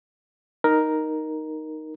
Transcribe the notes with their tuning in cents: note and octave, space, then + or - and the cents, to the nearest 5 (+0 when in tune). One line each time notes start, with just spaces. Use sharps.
D#4 +0 A#4 +5